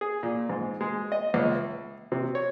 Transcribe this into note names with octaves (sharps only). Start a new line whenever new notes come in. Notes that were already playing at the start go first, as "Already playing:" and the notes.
G#4
A#2
G#2
G#3
D#5
C#2
E5
C3
C#5